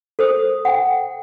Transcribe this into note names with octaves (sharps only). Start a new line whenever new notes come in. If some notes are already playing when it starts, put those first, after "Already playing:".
A4 C5 D#6
F#5 G5